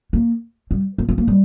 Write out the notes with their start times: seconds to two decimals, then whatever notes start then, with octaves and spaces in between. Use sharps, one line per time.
0.13 A#3
0.71 G3
0.98 B3
1.09 B3
1.18 A#3
1.28 G3